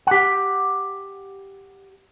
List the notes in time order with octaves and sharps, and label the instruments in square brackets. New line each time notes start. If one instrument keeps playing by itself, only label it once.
[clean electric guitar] G4 F#5